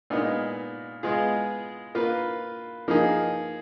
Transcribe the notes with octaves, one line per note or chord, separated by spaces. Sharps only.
A#2 G#3 B3 D#4
G#3 B3 F4 G#4
A#3 F4 B4
F3 A#3 D#4 G#4